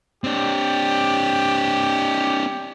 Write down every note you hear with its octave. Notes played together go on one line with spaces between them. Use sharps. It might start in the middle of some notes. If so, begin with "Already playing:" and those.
C4 D4 G4